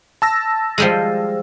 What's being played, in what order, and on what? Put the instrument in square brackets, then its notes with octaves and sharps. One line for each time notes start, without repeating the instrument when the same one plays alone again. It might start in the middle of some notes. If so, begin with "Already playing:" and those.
[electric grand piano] A5 E6 A#6
[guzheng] F3 G3 G#3